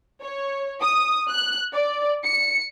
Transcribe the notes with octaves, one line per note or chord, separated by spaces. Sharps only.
C#5
D#6
F#6
D5
C#7